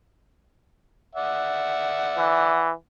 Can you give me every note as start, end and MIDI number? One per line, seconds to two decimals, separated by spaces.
1.15 2.69 74
1.15 2.69 76
1.15 2.69 78
2.18 2.72 52